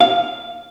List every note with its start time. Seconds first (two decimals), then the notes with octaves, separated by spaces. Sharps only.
0.01 F5